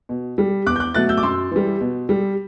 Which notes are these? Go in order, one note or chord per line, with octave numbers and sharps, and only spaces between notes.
B2
G3
E2 D6 F#6
G6
D6 F#6
B2 F#3 A3 F#6 A6
E6 G6
D6
F#2 C6 E6
E3 G3
B2
G3